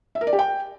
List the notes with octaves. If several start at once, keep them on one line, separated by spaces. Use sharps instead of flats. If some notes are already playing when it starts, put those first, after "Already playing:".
E5
A#4
D5
G4
G5